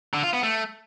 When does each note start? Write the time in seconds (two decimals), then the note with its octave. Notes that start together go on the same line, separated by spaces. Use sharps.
0.14 D3
0.23 F4
0.33 B3
0.43 A3